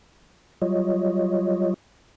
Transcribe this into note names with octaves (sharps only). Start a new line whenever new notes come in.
F#3 G3 F4 C#5 D#5